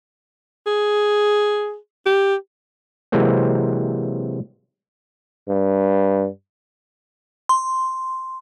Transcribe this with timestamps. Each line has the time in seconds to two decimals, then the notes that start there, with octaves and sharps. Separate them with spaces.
0.67 G#4
2.06 G4
3.12 C3 E3 F#3 G#3 A#3 C4
5.49 G2
7.49 C6